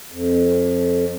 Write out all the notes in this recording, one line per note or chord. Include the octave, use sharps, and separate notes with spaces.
F2